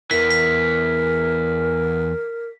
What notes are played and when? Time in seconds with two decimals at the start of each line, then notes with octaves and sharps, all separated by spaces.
0.11 E2 E3 A#4 B6
0.31 B6